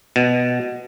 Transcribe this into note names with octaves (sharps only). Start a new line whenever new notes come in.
B2